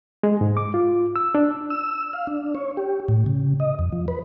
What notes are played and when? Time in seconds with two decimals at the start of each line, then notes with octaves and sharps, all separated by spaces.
0.23 G#3
0.41 G#2
0.57 D6
0.74 F4
1.16 E6
1.35 D4
1.70 E6
2.13 F5
2.27 D4
2.55 C#5
2.77 G4
3.08 A2
3.26 C#3
3.60 D#5
3.79 F2
3.92 F3
4.08 B4